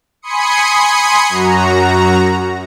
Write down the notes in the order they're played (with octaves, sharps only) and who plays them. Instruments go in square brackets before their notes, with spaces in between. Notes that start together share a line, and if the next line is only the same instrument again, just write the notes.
[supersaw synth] G#5 B5 C6 D#6 C#7
F#2 F#4 A#5